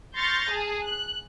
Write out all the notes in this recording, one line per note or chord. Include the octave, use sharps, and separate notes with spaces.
C6 C#6 F6 G6 A6 A#6
G#4 A5
F#6